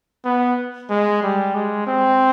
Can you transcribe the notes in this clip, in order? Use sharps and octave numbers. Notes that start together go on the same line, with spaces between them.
B3
G#3
G3
G#3
C4